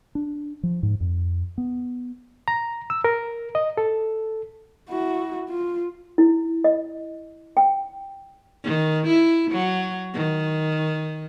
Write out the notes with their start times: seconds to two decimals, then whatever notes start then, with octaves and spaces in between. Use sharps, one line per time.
0.15 D4
0.63 F3
0.83 G#2
1.00 F2
1.58 B3
2.48 A#5
2.90 E6
3.04 A#4
3.55 D#5
3.77 A4
4.89 E4 F#4
5.49 F4
6.18 E4
6.64 D#5
7.57 G5
8.64 D#3
9.07 E4
9.51 F#3
10.14 D#3